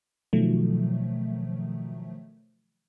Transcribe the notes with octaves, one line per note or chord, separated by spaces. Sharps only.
B2 D#3 F3 F#3 A3